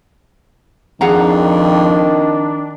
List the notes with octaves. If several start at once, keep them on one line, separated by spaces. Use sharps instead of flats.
F2 D#3 D4 G#4 F#5 A#5